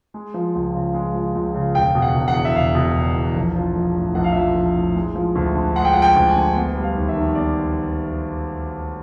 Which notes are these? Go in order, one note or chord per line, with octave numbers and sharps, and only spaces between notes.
G#3
F3
C#2
C#3
G#3
F3
C#2
C#3
E1 G5
B2
F#5
E1
F#5
E2
E5
E1 F5
B2
E1
E2
A#1
F3
A#1
A2
A#1 F#5
F5
E5
F3 F5
A#1
A2
G#3
F3
D2
D3
G#3 F#5
G5
F3 F#5
G5
D2
G#5
D3
B3 F#5
G3
F5
D#2
E5
D#3
B3 D5